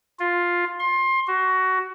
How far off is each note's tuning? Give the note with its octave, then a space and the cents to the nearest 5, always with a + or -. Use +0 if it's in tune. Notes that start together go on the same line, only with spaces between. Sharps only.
F4 +5
C6 +25
F#4 +20